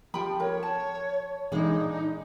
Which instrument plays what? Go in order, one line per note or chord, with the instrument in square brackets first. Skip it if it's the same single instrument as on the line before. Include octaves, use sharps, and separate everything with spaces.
[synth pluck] F3 [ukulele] F4 G5 B5 [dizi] G4
[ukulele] A#4 [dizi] C#5
[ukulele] A5
[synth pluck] A#2 E3 G#3 [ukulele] D4 G#4 [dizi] D#4